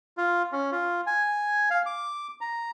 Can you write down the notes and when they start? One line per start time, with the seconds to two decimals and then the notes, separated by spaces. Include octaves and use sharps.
0.17 F4
0.52 C#4
0.72 F4
1.07 G#5
1.70 F5
1.86 D6
2.41 A#5